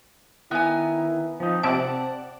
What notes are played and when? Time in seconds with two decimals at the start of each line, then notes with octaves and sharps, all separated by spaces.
0.51 D#3 B3 E4 G#5
1.40 F3 C4 D#4
1.63 C3 D5 E5 F#5 A5 D7